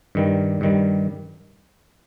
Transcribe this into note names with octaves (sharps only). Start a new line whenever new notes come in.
G2 D#3 G3
G2 D#3 G3